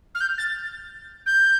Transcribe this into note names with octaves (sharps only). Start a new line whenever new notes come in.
F6
G6
A6
G6